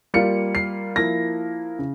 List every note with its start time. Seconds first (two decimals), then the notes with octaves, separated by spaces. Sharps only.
0.14 G3 A#3 F4 C#7
0.55 C7
0.96 F3 A#3 E4 A#6
1.79 C#3